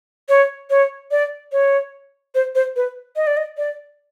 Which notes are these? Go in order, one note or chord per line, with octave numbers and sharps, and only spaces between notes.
C#5
C#5
D5
C#5
C5
C5
B4
D#5
D5
D#5
D5